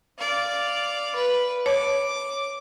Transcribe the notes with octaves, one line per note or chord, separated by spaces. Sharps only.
D5 F5
B4
C#5 D6